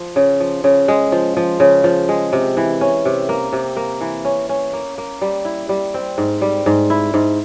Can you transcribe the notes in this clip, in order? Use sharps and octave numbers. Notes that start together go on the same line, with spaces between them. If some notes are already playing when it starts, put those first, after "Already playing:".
Already playing: F3
C#3
F3
C#3
G#3
F3
F3
C#3
F3
G#3
C3
E3
C#4
C3
A#3
C3
A#3
E3
C#4
C#4
A#3
A#3
G3
E4
G3
C4
G#2
G3
G#2
E4
G#2